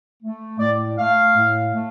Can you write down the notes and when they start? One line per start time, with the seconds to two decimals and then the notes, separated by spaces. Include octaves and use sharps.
0.23 A3
0.60 A2 D5
0.98 A3 F5
1.35 A2
1.74 A3